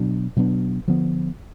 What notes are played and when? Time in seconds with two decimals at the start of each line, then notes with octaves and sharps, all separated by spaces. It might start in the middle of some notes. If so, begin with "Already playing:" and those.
Already playing: B2 F#3 B3 D4
0.36 B2 F#3 B3 D4
0.87 D3 F3 B3